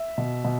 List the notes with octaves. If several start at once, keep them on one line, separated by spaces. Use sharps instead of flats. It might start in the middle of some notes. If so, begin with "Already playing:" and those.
Already playing: E5
B2
B2